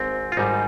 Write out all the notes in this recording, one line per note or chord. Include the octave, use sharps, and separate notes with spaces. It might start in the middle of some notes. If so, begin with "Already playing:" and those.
Already playing: G#1 G#2 C4
F4
G#1 G#2 G3 D#4